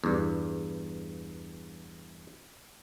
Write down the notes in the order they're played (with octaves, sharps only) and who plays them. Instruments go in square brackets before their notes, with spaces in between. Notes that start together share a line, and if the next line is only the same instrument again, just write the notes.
[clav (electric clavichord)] E2 G2